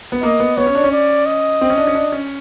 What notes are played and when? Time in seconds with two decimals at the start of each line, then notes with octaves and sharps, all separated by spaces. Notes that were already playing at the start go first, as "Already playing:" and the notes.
0.12 B3
0.23 A#3 D#5
0.40 B3
0.57 B3 C#5
0.66 C#4
0.75 D4
0.84 C#4
0.92 D5
1.26 D#5
1.61 C4
1.70 C#4
1.77 D4
1.87 C#4
1.95 D4
2.12 C#4